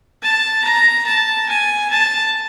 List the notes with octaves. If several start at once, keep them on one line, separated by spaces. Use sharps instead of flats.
A5
A#5
A5
G#5
A5